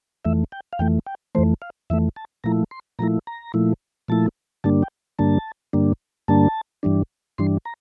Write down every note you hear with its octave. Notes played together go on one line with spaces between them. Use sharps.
F2 E3 A3 E5
G5
F5
F2 E3 A3 G5
G5
F2 E3 A3 C5
F5
F2 E3 A3 E5
A5
A#2 F3 A3 E4 A#5
C6
A#2 F3 A3 E4 A#5
A#5
A#2 F3 A3 E4
A#2 F3 A3 E4 A5
G2 D3 G3 A#3 D4 A5
G5
G2 D3 G3 A#3 D4 A5
G2 D3 G3 A#3 D4
G2 D3 G3 A#3 D4 A5
G2 E3 G3 D4
G2 E3 G3 D4 C6
A#5